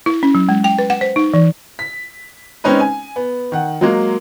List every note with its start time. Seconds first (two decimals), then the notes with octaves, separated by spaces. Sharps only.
0.06 E4
0.23 C#4
0.35 F#3
0.49 G#3
0.64 G5
0.79 B4
0.90 F#5
1.01 C5
1.16 D#4
1.34 E3
1.79 B6
2.64 G#3 C4 C#4 D#4 B4
2.80 G#5
3.16 B3
3.52 D#3 F#5
3.81 F#3 G#3 A#3